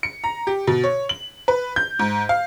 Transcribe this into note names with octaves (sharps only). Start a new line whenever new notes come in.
C#7
A#5
G4
B2
C#5
F#7
B4
G6
G#2
F5